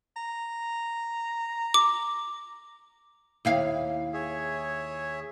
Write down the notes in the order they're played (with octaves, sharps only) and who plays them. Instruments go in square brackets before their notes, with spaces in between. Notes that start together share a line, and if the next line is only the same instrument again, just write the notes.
[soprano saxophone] A#5
[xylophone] D6
[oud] D#2 E4 F5
[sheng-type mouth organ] G#4 C#5 E5